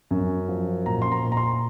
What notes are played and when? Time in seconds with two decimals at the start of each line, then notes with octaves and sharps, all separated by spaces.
0.11 F#2
0.49 F3
0.86 A#2 A#5
1.02 C6
1.12 A#5
1.24 A#2
1.32 A#5
1.37 C6